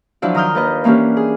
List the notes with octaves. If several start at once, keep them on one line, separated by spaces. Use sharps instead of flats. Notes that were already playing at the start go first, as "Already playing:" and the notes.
F3 F#3 D4 E4 F4
D#3 A#5 D#6 F6 G6
D#2 B4 D#5
E3 A#3 C#4 D4 G4
G#4